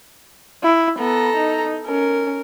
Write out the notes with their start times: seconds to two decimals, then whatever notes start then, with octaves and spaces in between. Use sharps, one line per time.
0.63 E4
0.99 B3 A4 A#5
1.37 D#4
1.87 C#4 A#4